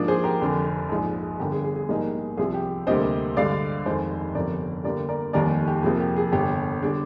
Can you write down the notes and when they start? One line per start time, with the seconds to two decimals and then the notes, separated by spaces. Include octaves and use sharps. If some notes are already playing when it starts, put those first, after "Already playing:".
Already playing: G#2 F3 A#3 D4
0.08 G#4 C5
0.24 G4 A#4
0.41 F1 F2 D3
0.89 A#1 G#2 F3
1.40 G1 G2 D3 G4 A#4
1.52 G#4
1.64 G#4
1.76 G#4
1.89 A#1 G#2 G3 A#3 D#4
2.37 C2 C3 F3 G#4
2.54 G4
2.87 D2 C3 G3 A#3 D4 C5 D#5
3.37 G2 D3 G#3 D4 D5 F5
3.86 F1 F2 D#3 G#3 C5 D#5
4.35 G1 F2 C3 A#4 D5
4.84 G2 D3 G3 A#3 A#4 D5
5.09 A#4 D5
5.33 F1 D#2 D#3 G3 A#4 D5
5.67 G4
5.83 F2 C3 F3 A#3 G#4
6.00 G4
6.16 G#4
6.32 G1 F2 C3 G3 G4
6.82 D3 G3 D4 G#4